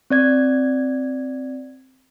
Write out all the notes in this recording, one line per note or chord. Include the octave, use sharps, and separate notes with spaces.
C4 D5 G#6